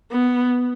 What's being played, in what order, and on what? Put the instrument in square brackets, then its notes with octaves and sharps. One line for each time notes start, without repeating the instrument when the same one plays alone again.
[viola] B3